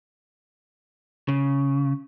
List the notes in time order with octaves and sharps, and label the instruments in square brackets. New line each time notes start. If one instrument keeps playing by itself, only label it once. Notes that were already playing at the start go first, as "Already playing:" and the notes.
[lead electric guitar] C#3